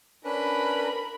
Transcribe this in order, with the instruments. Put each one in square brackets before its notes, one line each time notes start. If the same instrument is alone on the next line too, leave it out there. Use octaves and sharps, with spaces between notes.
[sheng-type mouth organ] C#4 D4 B4 [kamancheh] A#4 B5